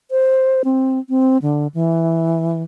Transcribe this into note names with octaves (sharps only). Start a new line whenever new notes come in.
C5
C4
C4
D3
E3